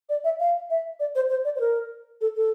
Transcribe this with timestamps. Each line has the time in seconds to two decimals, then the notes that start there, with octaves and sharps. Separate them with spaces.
0.09 D5
0.24 E5
0.40 F5
0.70 E5
1.00 D5
1.15 C5
1.30 C5
1.45 D5
1.56 C5
1.60 A#4
2.21 A4
2.36 A4